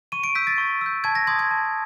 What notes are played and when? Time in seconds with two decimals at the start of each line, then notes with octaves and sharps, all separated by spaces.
0.12 C#6 D#7
0.24 D7
0.35 E6 G6 B6
0.47 A6
0.58 C#6
0.81 E6 G6
1.04 A5 G#6
1.15 A#6
1.27 C6 D#6 G#6
1.39 G#6
1.51 A5